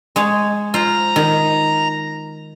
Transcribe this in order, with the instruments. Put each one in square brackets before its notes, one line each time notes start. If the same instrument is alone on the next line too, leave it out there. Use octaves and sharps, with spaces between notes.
[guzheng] G#3 G#4 C#5
[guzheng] F4 C5 [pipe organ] A#5
[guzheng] D#3